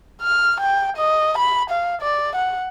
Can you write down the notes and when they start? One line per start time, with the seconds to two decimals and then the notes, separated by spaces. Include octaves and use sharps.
0.22 F6
0.61 G5
0.97 D#5
1.38 B5
1.70 F5
2.02 D5
2.35 F#5